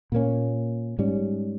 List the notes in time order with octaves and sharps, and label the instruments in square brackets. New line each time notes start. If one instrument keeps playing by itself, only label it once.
[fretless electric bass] A#2 A#3 C#4
G#2 G3 C#4